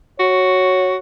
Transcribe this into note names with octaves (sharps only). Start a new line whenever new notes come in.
F#4 C#5